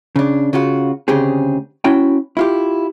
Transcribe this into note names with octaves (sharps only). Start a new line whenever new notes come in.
C#3 D4
C#3 F4 F#4
D2 C#3 C4 G4 G#4
C#4 E4 F#4 G5
E4 F4 G4